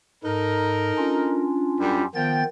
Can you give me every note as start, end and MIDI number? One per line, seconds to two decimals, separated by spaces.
0.24 0.92 44
0.24 1.46 63
0.24 1.46 69
0.24 1.46 70
0.98 2.04 61
0.98 2.04 62
0.98 2.04 65
1.80 2.05 42
1.80 2.05 55
2.15 2.43 51
2.15 2.45 53
2.15 2.43 59
2.15 2.45 79
2.15 2.43 93